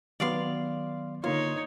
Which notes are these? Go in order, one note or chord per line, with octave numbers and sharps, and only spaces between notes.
D#3 F#3 B3 D5 F5 C6
D3 A#3 D#4 F4 C#5 C6